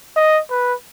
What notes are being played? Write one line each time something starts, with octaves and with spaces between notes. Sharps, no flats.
D#5
B4